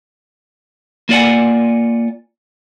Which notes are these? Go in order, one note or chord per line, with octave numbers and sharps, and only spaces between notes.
A#3 F4 D5 F#5 G#5